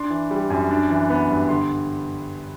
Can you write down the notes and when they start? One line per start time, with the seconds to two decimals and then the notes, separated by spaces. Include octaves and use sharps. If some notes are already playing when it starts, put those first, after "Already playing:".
Already playing: D4 C6
0.10 E3
0.31 G3
0.50 F#2
0.71 D4
0.90 E3
1.10 B3
1.30 G2
1.49 D3 C6